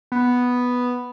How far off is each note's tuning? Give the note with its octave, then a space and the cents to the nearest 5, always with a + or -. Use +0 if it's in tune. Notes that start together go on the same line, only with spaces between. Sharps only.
B3 +0